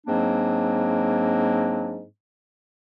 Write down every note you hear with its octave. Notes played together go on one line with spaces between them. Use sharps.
G#2 F#3 A#3 C4 D4